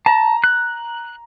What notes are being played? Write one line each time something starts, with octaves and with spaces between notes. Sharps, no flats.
A5 A#5
F#6